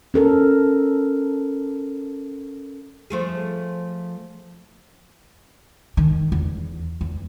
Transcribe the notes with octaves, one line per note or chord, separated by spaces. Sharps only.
C#4 A4 A#4
F3 A3 G#4
D#3
E2
E2